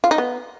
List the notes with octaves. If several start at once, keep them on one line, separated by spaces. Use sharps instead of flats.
F4
D#4
B3